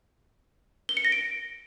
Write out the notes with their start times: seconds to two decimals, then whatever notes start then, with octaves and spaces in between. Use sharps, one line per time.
0.89 G7
0.97 C#7
1.05 A#6
1.12 D7